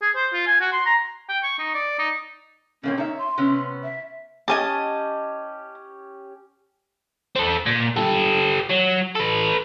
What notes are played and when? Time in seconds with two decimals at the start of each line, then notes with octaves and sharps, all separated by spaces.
0.02 G#4
0.16 C5
0.33 F4
0.47 G#5
0.61 F#4
0.72 C6
0.86 A#5
1.29 G5
1.43 C#6
1.59 D#4
1.75 D5
1.99 D#4
2.83 B2 A#3 C4 C#4
2.98 D#4 C#5 E5
3.18 C6
3.38 C3 B3 C#4
3.84 E5
4.48 C#4 G4 D#5 G#5 A5
7.36 C4 A4
7.66 A#2
7.96 G4 A4
8.70 F#3
9.16 A4 B4